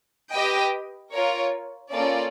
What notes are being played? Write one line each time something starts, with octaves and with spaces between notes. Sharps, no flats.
G4 B4 D#5 G5
F4 A#4 C#5
A#3 C#4 F4 A4 D5